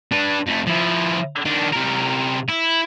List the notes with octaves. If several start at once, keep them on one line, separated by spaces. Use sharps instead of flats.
D4 B4
F2 A3
F3 E4
D#3 D4
C3 A#4
E4